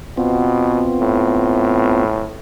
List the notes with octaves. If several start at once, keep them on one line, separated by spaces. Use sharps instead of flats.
B2 B3 C4 F4
A2